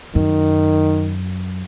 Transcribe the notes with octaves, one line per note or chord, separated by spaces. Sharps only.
F#2 D#3